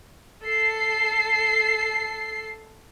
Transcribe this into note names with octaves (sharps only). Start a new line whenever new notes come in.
A4 C7